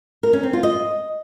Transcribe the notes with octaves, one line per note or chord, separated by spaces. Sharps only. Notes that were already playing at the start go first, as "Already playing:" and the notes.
A#4
C#4
C4
F4
D#5